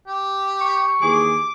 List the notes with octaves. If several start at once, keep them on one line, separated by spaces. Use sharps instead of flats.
G4
C#6
D#2 E3 G#4 D6